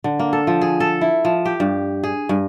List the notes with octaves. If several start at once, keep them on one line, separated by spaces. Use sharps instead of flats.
D3
A#3
A4
F3
G#4
A4
E4
F3
G4
G2
G#4
G2